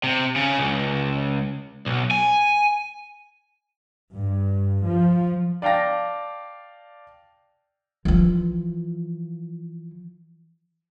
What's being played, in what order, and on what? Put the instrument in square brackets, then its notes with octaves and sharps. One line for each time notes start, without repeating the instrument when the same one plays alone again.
[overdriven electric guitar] C3
C#3
C#2
B1
G#5
[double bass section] G2
F3
[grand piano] D5 F5 G5 A5 A#6
[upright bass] E3 F3